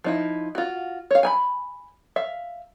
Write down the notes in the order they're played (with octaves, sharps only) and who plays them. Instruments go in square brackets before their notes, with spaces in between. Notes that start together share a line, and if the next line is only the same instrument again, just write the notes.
[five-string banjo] F3 D#4 E4
F4 F#4
C#5 F5
G#5 A#5 B5
E5 F5